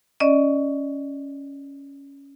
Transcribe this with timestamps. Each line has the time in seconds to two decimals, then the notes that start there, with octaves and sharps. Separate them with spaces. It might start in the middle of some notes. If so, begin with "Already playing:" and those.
0.20 C#4 D5 D#5